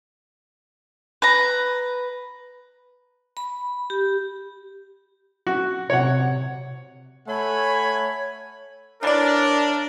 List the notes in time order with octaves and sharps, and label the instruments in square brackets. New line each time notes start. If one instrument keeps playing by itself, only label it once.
[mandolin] B4 A#5
[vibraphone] B5
G4
[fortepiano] F#4
[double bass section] C3 [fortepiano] C#5 F#5
[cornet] A3 [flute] C#5 [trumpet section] F#5 G#5 B5
[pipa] E3 D5 [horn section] D4 [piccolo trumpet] A#4 [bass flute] C#5